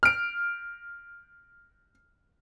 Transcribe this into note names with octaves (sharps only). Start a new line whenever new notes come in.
F6 D7